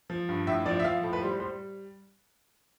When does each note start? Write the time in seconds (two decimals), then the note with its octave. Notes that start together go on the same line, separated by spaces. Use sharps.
0.10 F3
0.29 G2
0.47 A2 E5
0.66 F3 D5
0.80 E5
0.84 F3 F5
1.03 A2 A4
1.13 B4
1.22 G3 C5
1.40 G3 C5